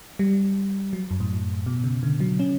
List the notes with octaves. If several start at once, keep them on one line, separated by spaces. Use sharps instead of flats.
G3
F#3
F#2
A2
B2
C#3
D3
F#3
C#4